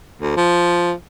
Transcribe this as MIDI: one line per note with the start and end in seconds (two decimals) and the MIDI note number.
0.21 0.35 38
0.36 0.93 53